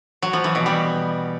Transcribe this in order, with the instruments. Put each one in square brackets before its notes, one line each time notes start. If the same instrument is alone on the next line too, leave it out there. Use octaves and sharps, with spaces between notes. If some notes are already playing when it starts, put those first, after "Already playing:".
[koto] F#3
F3
E3
B2
G3